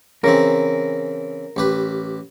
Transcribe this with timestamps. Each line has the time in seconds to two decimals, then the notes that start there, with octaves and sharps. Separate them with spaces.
0.24 C#3 E3 C4 A#4
1.56 A1 G4 B4